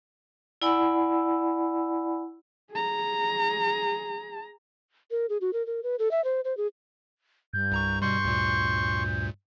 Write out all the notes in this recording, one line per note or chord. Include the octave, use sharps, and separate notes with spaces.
E4 D5 F#5 G#5 B5 E6
G#4 A#5
A#4
G#4
F#4
A#4
A#4
B4
A4
E5
C5
C5
G#4
G2 G6
C2 A#5 C#6
B2 G3 C6 C#6 G6
D2 A#2